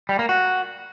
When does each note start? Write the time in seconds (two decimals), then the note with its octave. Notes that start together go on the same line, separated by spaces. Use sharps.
0.09 G3
0.19 A#3
0.29 F#4